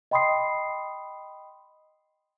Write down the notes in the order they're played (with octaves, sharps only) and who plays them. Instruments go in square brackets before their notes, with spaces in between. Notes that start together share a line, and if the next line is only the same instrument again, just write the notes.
[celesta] D#5 G5 B5 C6 D#6 C7